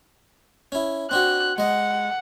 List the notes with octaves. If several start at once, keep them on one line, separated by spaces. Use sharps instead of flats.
C#4 E4
C4 D4 F#4 F#6
G#3 D#5 F#5